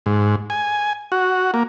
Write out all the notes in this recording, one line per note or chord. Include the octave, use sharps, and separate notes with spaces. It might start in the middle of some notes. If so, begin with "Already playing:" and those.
G#2
G#5
F#4
A#3